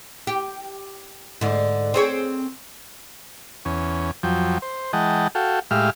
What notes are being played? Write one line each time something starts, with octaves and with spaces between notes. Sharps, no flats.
G4
G#2 D3
C4 G#4 C#5
E2 C#4
F2 F3 F#3 G5
C5
E3 G#3 D#5 F#5 G5 A5
F#4 A4 F5 G5
A2 G#3 G4 E5 F5 F6